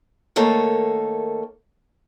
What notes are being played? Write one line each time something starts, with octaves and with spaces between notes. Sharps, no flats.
D#3 A3 A#3 A4 C#5